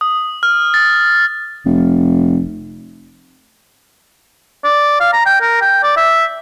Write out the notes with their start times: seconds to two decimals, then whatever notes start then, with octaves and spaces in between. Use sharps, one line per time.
0.01 D#6
0.43 F6
0.74 A6
1.65 F1
4.64 D5
5.00 F5
5.13 A#5
5.26 G5
5.41 A#4
5.61 G5
5.83 D5
5.96 E5